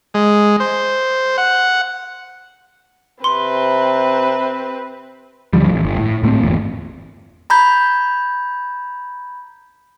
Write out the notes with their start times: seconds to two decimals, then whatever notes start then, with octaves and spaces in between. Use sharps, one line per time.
0.14 G#3
0.60 C5
1.38 F#5
3.24 C3 C4 B4 C6
5.53 D#2 D3 F3 G3
5.69 A1
5.83 G1
5.98 A2
6.23 A2 A3 A#3 C4
6.42 G1 E2 A#2
7.50 A#5 B5 G6 G#6